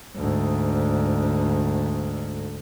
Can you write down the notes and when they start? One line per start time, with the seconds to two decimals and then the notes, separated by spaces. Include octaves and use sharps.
0.16 D2 G#2